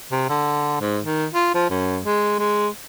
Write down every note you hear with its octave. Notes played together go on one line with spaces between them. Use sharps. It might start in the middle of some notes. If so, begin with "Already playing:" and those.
C3
D3
G#2
D#3
F4
F3
F#2
G#3
G#3